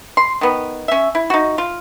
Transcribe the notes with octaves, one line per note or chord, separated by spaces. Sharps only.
C6
D#3 B3
C#4 E5
E4
D#4 F#4
F4